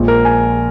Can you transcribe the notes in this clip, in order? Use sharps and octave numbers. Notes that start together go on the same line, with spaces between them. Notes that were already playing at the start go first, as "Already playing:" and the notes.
Already playing: A#1 A#2 F3 G#3
A#4
G#5